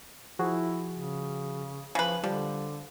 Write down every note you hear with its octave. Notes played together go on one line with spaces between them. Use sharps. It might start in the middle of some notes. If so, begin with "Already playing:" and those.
F3 E4 F#4 G#4
C#3
C#3 F3 B4
D3 F3 G3